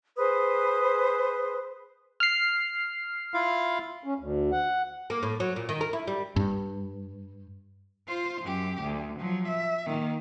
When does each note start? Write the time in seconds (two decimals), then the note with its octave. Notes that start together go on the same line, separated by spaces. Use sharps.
0.17 G#4 B4 C5 D#6
2.20 F6 C7
3.34 E4 F4 F5
4.04 C#4
4.19 D2
4.51 F#5
5.10 A#3
5.23 A2
5.40 F#3
5.56 A#2
5.69 D#3
5.81 A#4
5.93 E4
6.07 G3
6.36 G2
8.07 F4 C5
8.42 F#2 G4
8.82 D2
9.19 F3 F#3
9.48 E5
9.86 D#3 A#3